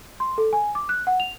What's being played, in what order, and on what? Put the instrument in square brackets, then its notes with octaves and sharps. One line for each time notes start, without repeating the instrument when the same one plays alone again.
[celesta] C6
A4
G#5
D6
F#6
F#5
F7